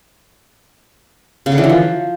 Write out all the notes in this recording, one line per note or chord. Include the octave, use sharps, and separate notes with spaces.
C#3
D3
E3
F#3
F3